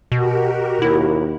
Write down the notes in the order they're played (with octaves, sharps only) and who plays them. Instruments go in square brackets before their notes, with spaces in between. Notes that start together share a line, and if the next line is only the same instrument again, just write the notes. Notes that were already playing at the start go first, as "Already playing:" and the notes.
[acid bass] B2 [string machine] F#4 G4 A#4
[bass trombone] D#2 [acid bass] E4